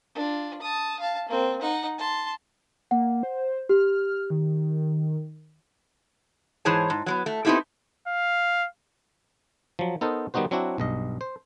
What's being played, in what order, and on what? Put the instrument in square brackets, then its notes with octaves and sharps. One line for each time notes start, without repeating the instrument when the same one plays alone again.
[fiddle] D4 F4
A5 D#6
F5 A5
A#3 C4
D#4 F#5
A5 C6
[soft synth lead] A#3 [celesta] F#5
[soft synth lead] C5
[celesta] G4 [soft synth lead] F6
[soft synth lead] D#3
[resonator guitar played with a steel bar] G#2 E3 G#4 C5 C#5 A5
G#2
F#3 G#3 B3
A3
B3 C4 D#4 E4 G4 A4
[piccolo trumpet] F5
[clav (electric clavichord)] F3 F#3
B3 D#4 A4 A#4 C5
D#3 G3 B3 D#4 F#4 C5
F#3 C4 D4 E4 F#4
B1 G2 D#5
C5